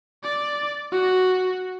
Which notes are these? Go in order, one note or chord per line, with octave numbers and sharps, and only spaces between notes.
D5
F#4